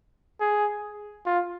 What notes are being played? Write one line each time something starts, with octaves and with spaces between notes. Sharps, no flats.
G#4
F4